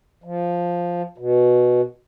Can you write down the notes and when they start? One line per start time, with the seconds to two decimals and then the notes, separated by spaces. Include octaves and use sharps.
0.24 F3
1.18 B2